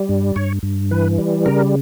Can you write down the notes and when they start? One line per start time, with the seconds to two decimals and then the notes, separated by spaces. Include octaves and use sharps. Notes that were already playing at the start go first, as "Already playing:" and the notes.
Already playing: G3
0.09 G2
0.36 G2 C#5
0.63 G2
0.91 E3 B4
1.18 G3
1.46 C#3 A#4